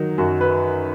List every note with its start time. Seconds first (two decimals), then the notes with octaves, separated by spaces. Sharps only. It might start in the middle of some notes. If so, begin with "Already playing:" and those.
Already playing: D#3 F#3 D#4
0.18 F#2 F#4
0.41 B4